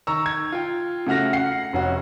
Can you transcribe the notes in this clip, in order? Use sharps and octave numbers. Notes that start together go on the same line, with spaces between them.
D#3 A#5 C#6 E6
G#6
F4 G5
C#3 A3 F#4 F6 A#6
F#5 C7
F1 C#4 F#4